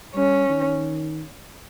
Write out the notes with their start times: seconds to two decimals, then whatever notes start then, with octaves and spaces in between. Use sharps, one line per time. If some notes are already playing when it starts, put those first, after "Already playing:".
0.15 G3 C#4
0.50 D#3